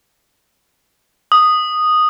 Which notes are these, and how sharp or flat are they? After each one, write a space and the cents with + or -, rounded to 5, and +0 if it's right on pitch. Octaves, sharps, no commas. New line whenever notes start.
D#6 -10